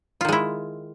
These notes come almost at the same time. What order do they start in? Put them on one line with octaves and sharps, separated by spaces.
F4 D#3 G#3 E4